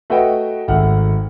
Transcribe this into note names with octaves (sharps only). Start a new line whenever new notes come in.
A3 F#4 B4 D#5 F#5 G5
G#1 A3 F#5 F6